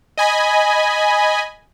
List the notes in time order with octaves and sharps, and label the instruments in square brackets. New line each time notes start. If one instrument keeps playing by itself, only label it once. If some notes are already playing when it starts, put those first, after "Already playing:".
[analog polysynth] D#5 G#5 B5